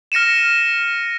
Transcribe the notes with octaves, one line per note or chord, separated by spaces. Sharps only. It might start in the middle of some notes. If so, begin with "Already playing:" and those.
F6 A#6 C#7 D#7 E7